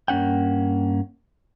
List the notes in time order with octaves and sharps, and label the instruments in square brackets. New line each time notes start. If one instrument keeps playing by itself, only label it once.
[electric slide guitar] G2 A#3 C#4 F#5 G5